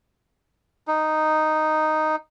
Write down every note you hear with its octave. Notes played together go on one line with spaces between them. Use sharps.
D#4